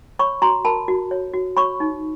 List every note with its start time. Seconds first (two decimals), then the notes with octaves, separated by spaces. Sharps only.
0.19 C#5 B5 C#6
0.42 F#4 A#5 C6
0.65 A#4 A5 B5
0.88 F#4
1.11 C#5
1.33 F#4
1.57 C#5 B5 C#6
1.80 D#4